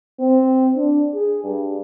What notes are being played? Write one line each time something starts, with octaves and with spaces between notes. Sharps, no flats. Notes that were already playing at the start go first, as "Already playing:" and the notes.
C4
D4
G#4
G2